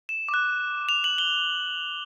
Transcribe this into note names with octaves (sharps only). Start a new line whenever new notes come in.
E7
D6
F#6
F7
F#7
G7